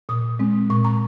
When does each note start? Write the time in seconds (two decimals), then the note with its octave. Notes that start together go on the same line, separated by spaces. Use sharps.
0.09 A#2 D#6
0.39 G#3 C4
0.70 A#2 C#6
0.85 A#5